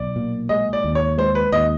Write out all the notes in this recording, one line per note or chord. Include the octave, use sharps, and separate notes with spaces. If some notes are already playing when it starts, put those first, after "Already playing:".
Already playing: B1 D5
A#2
G#3 D#5
D5
D#2
C#5
G#3 C5
B4
D#2 D#5